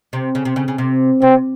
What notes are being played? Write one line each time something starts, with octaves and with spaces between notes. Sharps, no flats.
C3
C#3
C3
C#3
C#3
C3
C3 C4